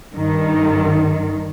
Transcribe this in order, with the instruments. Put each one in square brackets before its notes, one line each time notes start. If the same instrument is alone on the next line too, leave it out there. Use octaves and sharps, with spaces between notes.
[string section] G2 D#3